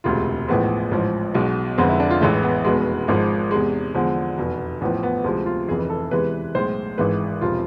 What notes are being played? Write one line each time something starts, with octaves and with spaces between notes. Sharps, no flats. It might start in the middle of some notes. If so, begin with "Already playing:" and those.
E1 D2 C3 G#3 F4
A1 A2 F3 G#3 B3
A1 G#2 F3
B1 B2 G#3
F1 F2 D3 G#3 C4
E4
D4
F4
A1 A2 E3 G#3 A3
B3
F1 E2 B2 G#3
G#1 G#2 F3 G#3
E2 C3 G#3
E2 D3 F3 G#3
F1 E2 B2
A1 A2 F3 B3
B3
D2 C3 F3 G#3
F4
F1 F2 E3 G#4
A4
E2 C3 E3 G#3 B4
B1 A2 G#3 C5
G#1 G#2 E3 G#3 B4
E1 C3 F3 F4